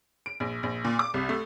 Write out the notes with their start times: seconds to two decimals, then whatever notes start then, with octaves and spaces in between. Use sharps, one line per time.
0.26 D7
0.40 A#1
0.63 A#1
0.85 A#2
0.99 D6
1.14 C2
1.29 A3